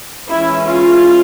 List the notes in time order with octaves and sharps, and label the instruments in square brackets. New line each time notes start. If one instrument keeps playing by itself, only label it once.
[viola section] E3 G#3 C#4 E4
F4